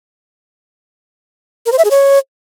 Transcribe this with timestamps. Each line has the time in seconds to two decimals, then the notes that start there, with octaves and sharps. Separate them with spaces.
1.66 A#4
1.72 C5
1.78 E5
1.85 G#4
1.91 C#5